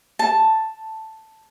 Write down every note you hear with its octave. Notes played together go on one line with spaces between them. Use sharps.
A5